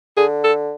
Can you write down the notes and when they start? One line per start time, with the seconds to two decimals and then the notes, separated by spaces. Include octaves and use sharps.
0.17 D3 G#4
0.44 A4